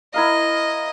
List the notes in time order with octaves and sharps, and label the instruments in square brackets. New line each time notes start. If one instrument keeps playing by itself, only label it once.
[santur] E4 A#4 F5 [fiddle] D#5